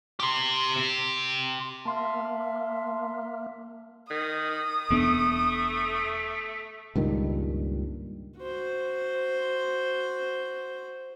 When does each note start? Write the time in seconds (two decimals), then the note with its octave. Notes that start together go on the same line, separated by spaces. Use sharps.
0.20 G4 C6
1.85 A#3 E5 A5 C6
4.10 D#3 D#6
4.90 E1 A3 B3 D4
6.96 C#2 G2 A#2 D#3
8.40 F#4 C5